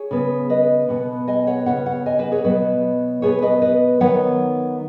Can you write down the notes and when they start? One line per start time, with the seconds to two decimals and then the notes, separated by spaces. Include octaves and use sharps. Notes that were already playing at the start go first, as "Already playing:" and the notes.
Already playing: G#4 C#5
0.11 C#3 B3
0.50 B4 D#5
0.88 B2 B3
1.28 D#5 G#5
1.47 C#5 F#5
1.66 C#3 B3 C#5 F#5
1.86 C#5 F#5
2.06 D#5 G#5
2.19 F#4 B4
2.31 G#4 C#5
2.44 B2 F#3 B3 B4 D#5
3.22 B2 B3 G#4 C#5
3.42 B4 D#5
3.62 B4 D#5
4.00 D#3 F#3 B3 C#5 F#5